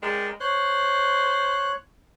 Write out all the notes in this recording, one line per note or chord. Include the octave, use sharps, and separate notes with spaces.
G#3 A#4 D5 G5
C5 C#5 F#6